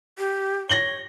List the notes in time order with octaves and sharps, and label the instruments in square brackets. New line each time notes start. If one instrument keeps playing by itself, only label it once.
[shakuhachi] G4
[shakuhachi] C#5 [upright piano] A#6 F#7 G7